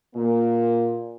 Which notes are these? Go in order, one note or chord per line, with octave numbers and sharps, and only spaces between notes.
A#2 A#3